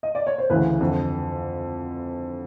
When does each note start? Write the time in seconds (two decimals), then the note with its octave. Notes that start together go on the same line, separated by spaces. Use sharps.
0.03 D#5
0.15 D5
0.27 C#5
0.38 C5
0.50 D2 C#3 E3 B4
0.81 F2 D3